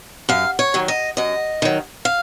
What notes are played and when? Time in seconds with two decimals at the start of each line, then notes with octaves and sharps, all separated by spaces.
0.29 F#2 F5
0.59 C#5
0.74 D#3 F#3
0.88 D#5
1.17 F#2 D#5
1.62 D#3 F#3
2.05 F5